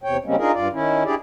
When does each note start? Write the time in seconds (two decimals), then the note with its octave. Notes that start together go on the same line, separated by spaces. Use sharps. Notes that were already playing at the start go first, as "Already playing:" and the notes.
0.04 E2 C3 C#5 G5
0.25 C#3 G3 G#3 A#3 C4 C#4
0.38 D4 D#4 F4 G#4 A#4
0.53 G2 F4 D5
0.73 D#3 C#4 E4
1.05 D4 E4 G4 G#4 D5